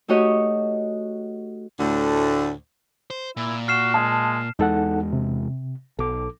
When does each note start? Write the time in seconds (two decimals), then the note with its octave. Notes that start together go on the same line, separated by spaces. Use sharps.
0.08 A3 D#4 F#4 G4 C#5 D#5
1.78 D2 A2 D3
3.10 C5
3.37 A#2 E4
3.68 F#4 F6 C7 E7
3.94 G#3 A5
4.59 E2 G#3 D#4 A4 F#5
5.13 C3
5.99 B1 A4 D6